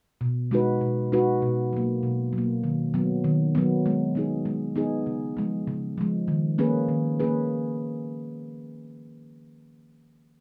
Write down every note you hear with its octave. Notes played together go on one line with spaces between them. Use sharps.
B2
G#3 D#4 F#4 B4
B2
G#3 D#4 F#4 B4
B2
F#3 A#3
B2
F#3
A#3
D#3
F#3 B3
D#3
F#3 B3
G#3
B3 D#4 G#4
G#3
B3 D#4 G#4
C#3
F3 G#3
C#3
F3 G#3
D#3
A#3 C#4 G#4 B4
D#3
A#3 C#4 G#4 B4